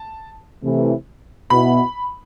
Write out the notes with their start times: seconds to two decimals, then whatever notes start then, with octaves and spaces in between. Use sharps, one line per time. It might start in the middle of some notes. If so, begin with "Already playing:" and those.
Already playing: A5
0.63 C3 E3 A3
1.50 B2 B3 E4 B5